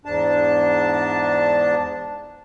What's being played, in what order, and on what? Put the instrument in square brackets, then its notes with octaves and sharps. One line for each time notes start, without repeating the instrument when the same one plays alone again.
[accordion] E2 G#2 D4 A5